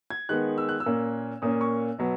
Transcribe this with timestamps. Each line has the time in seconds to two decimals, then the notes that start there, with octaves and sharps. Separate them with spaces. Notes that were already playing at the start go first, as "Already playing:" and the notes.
0.10 G#6
0.29 D#3 G#3 B3 F#6
0.58 E6
0.69 F#6
0.80 E6
0.86 A#2 A#3 C#4
1.42 A#2 A#3 C#4 D#6
1.61 C#6
1.99 B2 F#3 B3